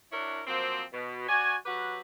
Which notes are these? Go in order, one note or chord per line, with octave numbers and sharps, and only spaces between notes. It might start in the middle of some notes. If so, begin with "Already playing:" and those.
D4 E4 F#4 A#4 C#5
F3 F#3 A#3 C4
B2
F#4 C#5 D5 G#5
F#3 F#4 G4 B4